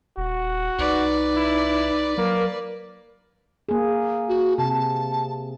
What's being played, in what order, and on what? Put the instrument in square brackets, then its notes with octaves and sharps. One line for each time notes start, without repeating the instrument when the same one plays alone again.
[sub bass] D#1 [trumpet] F#4
[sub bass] C2 [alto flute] D#4 [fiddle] B4 D5
[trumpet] E4
[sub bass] F#3 [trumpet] A#3 [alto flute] A#4
[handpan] A#3 G#4
[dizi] F#4
[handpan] C3 [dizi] A5
[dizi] A5